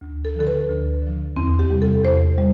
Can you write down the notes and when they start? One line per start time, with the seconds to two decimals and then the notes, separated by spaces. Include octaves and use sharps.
0.01 D2
0.25 A4
0.35 D3 F3 A4
0.47 B4
0.69 D2
1.02 D3 F3
1.36 E2 C4
1.59 G4
1.70 C3 G3
1.82 A4
2.04 E2 C5
2.38 G3